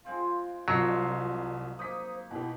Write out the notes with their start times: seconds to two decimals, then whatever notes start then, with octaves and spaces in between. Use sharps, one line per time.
0.05 G#3 C4 F4 F5
0.68 C2 F3 F#3 F4 D#5 C7
1.79 A#3 D#4 C5 D#6 B6
2.31 B2 E4 G4